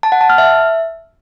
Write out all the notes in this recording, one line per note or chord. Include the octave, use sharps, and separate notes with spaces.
A5
F#5
A5
F6
E5